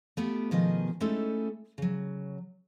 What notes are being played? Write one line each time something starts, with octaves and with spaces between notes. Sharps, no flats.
A3 B3 F4 G4
B2 D#3 F3 G#4 D#5
G#3 A3 C#4 D#4 E4 A4
C#3 F#3